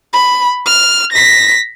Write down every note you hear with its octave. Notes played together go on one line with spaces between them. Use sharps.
B5
F6
A#6 B6